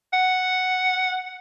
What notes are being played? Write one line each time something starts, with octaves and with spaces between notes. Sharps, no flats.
F#5